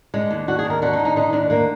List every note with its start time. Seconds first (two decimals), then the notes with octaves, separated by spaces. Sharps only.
0.14 D3 G#3
0.31 D#2
0.48 D3 F#4
0.59 G#4
0.65 D#2
0.70 A#4
0.82 D3 F#4
0.93 D#4
1.00 D#2
1.05 D#4
1.16 D3 D#4
1.33 D#2 D4
1.50 D3 A#3